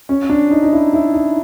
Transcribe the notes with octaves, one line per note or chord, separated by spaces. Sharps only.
C#4
D4
D#4
D#4
E4
E4
D#4